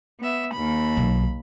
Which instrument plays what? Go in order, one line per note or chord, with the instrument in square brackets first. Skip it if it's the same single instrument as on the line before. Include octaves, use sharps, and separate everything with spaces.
[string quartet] B3 E5
D#2 B5
[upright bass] B1